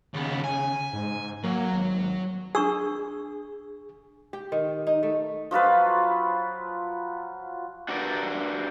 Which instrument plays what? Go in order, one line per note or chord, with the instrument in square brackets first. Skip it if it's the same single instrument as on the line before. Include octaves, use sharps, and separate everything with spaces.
[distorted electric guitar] D#2 B3 [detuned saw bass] C#3
[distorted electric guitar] G#5
[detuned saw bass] G#2
[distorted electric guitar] F#3 [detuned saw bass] A#3
[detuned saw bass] G#1
[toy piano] D4 C#6 E6 [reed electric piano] G#4
[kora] G4
D#3
D#4
A3
[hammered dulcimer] F3 F#3 F4 B4
[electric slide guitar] D4 F#4 G4 A#4 B4 D5